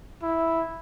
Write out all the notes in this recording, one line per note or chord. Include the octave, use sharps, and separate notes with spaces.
E4